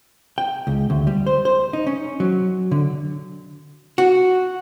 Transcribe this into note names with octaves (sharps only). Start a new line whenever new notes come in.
G5
C#2
D2
G3
C5
C5
D#4
C#4
F#3
D3
F#4